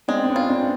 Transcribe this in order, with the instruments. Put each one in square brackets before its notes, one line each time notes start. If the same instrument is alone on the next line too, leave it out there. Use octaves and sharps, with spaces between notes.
[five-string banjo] G#3 [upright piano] C4 D4
[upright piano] C4
B3 C#4
[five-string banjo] F4
[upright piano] C4 D4